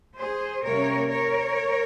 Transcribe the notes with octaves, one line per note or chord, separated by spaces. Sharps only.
G#4 C5
C3 G3 A#3 C#4 A#4 C#5
A#4 C#5